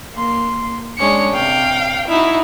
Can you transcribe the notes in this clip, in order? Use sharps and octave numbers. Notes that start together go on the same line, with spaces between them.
A#3 C6
G#3 C#4 D4 C#7
C3 F5 G5
D#4 E4 F#4